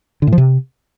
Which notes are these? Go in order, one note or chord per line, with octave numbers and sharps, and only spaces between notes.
D3
A2
F3
C3